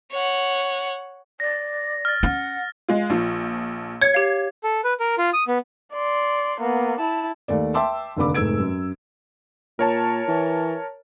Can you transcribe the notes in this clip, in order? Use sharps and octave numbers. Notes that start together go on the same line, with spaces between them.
C#5 F#5
D5 A#6
F6 A6
C#4 F#5
G#3 F4
A#1 F3
C#5 G#6 C#7
G4 F5
A4
B4
A#4
F4
D#6
B3
D5 C6
A#3 B3
E4 A5
D#2 A3 D5
E5 G5 A5 C6 D6 E6
F1 D#2 D3 D4 B5 D6
F1 G#2 A3 E6 G#6 D7
F#2
A#2 A#4 C#5 A5
E3